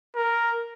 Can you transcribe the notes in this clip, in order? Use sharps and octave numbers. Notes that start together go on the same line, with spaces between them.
A#4